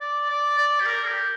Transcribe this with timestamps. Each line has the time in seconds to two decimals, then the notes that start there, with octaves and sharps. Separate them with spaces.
0.01 D5
0.30 D5
0.58 D5
0.80 G4
0.86 A#4
1.07 G4